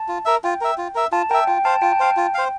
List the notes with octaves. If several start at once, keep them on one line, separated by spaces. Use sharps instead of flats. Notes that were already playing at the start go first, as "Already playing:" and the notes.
Already playing: A5
F4
A#4 E5
F4 G5
A#4 E5
F4
A#4 E5
F4 A5
A#4 E5 G5
F4 G5
C5 F5 A5
F4 G5
A5
C5 F5 G5
F4
C5 F5